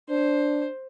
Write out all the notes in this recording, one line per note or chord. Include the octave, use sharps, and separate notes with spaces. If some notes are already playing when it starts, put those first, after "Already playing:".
D4 C5